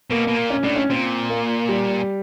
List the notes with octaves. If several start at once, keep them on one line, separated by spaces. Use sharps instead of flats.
B2 A#3
B2
A#2
C#4
A2 D4
C#4
A#2 C4
A#3
G3